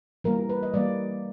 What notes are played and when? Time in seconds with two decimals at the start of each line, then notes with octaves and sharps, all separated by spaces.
0.24 E3 G3 A#3 A#4
0.49 B4
0.63 D#5
0.73 E3 G3 A#3 D5